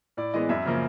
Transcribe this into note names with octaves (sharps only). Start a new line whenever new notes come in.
A2 D5
E3 G#3 B3 D#5
F#2 E5
C#3 F3 A#3